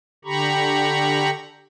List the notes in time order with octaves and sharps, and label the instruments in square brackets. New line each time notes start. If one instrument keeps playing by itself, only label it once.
[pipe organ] D3 G4 A#5 B5 C#6